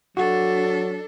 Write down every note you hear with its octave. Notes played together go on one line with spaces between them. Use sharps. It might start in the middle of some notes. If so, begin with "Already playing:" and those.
F#3 D4 F#4 A4